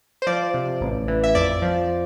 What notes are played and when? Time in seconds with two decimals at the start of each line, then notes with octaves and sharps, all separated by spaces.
0.22 C5
0.27 F3 D5
0.54 C3
0.81 A1
1.08 E3
1.24 E5
1.35 F2 D5
1.62 F3